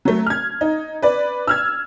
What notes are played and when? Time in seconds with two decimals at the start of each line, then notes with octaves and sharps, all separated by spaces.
0.05 F#3 A3
0.26 F6 G#6
0.61 D#4
1.02 B4 D5
1.47 E6 F6 G#6